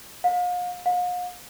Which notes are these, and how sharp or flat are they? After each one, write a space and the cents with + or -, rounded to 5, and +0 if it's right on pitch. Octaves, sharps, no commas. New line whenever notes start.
F5 +40
F5 +45